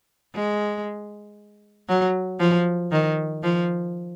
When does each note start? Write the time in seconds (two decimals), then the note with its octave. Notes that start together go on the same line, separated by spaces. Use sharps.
0.34 G#3
1.88 F#3
2.39 F3
2.92 D#3
3.43 F3